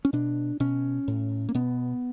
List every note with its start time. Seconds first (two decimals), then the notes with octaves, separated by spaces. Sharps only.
0.05 C#4
0.13 B2 D4
0.60 B2 C#4
1.08 A2
1.49 A#3
1.55 B2 B3